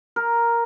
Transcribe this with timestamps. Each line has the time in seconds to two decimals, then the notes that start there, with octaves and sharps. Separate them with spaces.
0.16 A#4